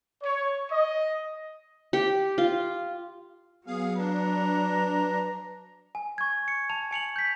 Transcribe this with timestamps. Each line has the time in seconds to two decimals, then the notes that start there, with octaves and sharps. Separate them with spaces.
0.22 C#5
0.70 D#5
1.93 G4
2.38 F4
3.67 F#3 B3 G#4 F5
3.98 D4 B4 A#5
5.95 G#5
6.18 C#6 G#6
6.48 C#7
6.70 A5 F7
6.91 G#5 C#7 F7 F#7
7.16 G6 B6